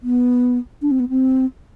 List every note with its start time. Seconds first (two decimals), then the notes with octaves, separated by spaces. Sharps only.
0.03 B3
0.82 D4
0.91 C4
1.00 B3
1.09 C4